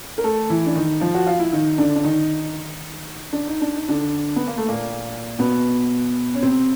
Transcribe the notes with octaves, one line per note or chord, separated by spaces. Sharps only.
A#4
A3 A4
E3 E4
D4
D#3 D#4
F3 F4
F#4
F4
E4
D#3 D#4
D3 D4
D4
D#3 D#4
D4
D#4
D4
D#4
D3 D4
B3
A#3
A3
A#2 A#3
B2 B3
C#4
C3 C4